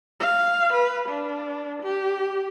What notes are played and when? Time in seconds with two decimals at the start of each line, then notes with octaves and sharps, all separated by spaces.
0.20 F5
0.73 B4
1.09 D4
1.83 G4